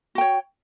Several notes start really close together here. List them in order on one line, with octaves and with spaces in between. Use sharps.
F#4 G5 C#5